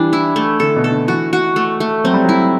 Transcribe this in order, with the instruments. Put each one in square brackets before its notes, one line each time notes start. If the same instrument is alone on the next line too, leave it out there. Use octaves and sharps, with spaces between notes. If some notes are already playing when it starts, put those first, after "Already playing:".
Already playing: [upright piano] E3 [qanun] G3 D4
[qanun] E4
A3
[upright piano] D3 [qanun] A4
[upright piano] B2
[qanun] A4
[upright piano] D3
[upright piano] E3 [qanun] F#4
[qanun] F#4
A3
A3
[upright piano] F#3 [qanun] C4
[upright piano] G3
[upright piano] F#3 [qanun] E4